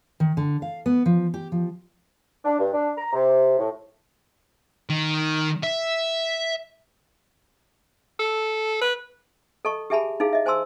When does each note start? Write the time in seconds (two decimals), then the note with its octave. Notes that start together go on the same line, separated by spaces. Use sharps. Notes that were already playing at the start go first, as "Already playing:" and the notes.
0.20 D#3
0.37 D3
0.62 F5
0.86 B3
1.06 F3
1.34 G4
1.52 F3
2.44 D4
2.59 G2
2.73 D4
2.97 A#5
3.13 C3
3.58 A2
4.90 D#3
5.63 E5
8.19 A4
8.82 B4
9.65 A4 D#5 A5 C#6
9.90 G4 G#4 E5 G#5 A5 B5
10.20 D#4 E4 G#4 F5
10.33 D#5 E5
10.46 C5 G#5 A5 C6 E6